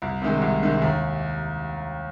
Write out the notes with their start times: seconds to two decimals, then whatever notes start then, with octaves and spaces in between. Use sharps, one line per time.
0.02 C2
0.22 C3 D#3 G#3
0.42 C2
0.62 C3 D#3 G#3
0.82 D#2